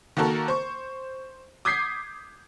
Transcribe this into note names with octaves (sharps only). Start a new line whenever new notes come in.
D#3 A#3 F#4 A4 A#4
C5 C#6
D6 D#6 G6 G#6 B6 C7